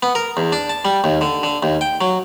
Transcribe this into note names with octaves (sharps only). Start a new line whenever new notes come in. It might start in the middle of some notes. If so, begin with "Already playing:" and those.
B3
A#4
E2
D4
A5
G3
D#2
D3
D3
D#2
G5
F#3